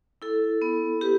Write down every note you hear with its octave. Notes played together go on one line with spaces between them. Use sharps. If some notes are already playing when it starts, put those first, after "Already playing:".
E4 A4
B3
B3 G4 B4